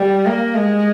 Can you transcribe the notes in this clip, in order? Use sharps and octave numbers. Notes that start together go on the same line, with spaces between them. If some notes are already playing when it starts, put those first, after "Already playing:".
Already playing: G3
A#3
G#3